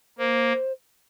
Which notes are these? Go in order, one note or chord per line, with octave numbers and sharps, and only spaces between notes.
A#3 C5